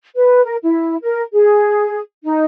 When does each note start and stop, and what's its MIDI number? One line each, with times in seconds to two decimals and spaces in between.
0.15 0.44 71
0.44 0.56 70
0.63 0.96 64
1.02 1.22 70
1.33 2.00 68
2.24 2.45 63